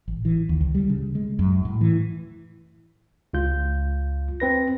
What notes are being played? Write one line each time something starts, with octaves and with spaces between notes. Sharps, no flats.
A1
E3
D#2
C#2
G3
C#3
G#3
F#2
A2
E3
C#2 F4 G6
C4 B4 A#6